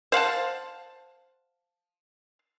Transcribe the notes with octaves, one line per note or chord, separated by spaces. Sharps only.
C5 F5 F#5 A5